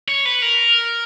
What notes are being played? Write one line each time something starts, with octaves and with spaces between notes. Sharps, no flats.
C#5
B4
A#4